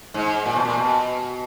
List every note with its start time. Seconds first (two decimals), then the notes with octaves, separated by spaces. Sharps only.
0.14 G#2
0.46 A#2
0.56 B2
0.65 A#2
0.78 B2